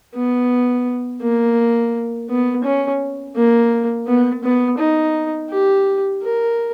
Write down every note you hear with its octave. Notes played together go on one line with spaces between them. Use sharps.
B3
A#3
B3
C#4
A#3
B3
B3
D#4
G4
A#4